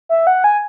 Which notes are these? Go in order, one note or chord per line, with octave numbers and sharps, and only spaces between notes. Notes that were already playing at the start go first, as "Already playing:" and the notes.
E5
F#5
G#5